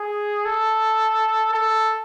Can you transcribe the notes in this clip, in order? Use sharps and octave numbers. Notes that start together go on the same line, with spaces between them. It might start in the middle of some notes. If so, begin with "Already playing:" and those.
Already playing: G#4
A4
A4